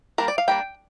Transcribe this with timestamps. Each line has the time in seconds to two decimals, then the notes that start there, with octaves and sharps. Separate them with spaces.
0.18 G3 A#3 D4 A#4
0.28 D5
0.38 F5
0.48 G3 A#3 D4 G5